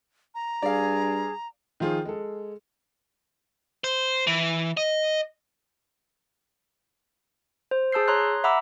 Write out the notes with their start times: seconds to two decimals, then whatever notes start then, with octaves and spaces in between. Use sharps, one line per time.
0.35 A#5
0.62 G2 G#4 D5 F5
1.80 D#3 F3 F4 G#4
2.05 G#3 A4
3.84 C5
4.27 E3
4.77 D#5
7.71 C5
7.92 G#4 A5 E6 G6 C7
8.07 C#5 A#5 C6 D#6 F#6 C7
8.44 E5 F#5 A#5 B5 D6 E6